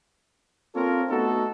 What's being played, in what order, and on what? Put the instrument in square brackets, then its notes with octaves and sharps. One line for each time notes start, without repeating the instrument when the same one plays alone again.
[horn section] A#3 C4 F4 A4 A#4 C#5
A3 B3 D#4 F#4 A4